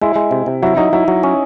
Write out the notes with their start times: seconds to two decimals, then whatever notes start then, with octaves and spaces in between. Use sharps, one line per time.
0.02 G#3 E4
0.16 G#3
0.31 C3
0.46 C3
0.63 F#3 E4
0.77 F#3 D#4
0.93 F#3 E4
1.08 F#3
1.23 C#4